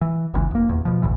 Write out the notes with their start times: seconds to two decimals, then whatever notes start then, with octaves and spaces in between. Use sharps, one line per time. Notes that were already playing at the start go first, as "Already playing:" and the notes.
0.01 E3
0.34 G1 C#2 B2 E3
0.51 F1 A#3
0.69 D#1 E2
0.85 B2 F3
1.02 G1 D2 A2 E3